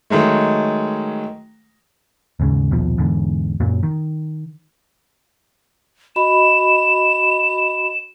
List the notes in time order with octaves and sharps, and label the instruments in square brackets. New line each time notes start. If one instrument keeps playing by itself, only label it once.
[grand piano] D#3 F#3 G#3 A3
[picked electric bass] D#2 G#2 C#3
A#1 D#2 B2 F3
E2 G#2 D3
F#2 A#2 F#3
D#3
[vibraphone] F#4 D#5 B5 [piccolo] E7